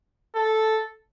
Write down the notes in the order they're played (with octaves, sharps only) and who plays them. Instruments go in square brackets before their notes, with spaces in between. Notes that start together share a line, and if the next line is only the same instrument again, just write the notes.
[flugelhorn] A4